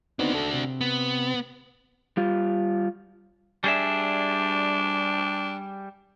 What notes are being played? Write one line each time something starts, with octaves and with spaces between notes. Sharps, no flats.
B3 C4 D4 D#4 F#4
A4
C3
B3
G3 F4
G3 D4 G#4 E5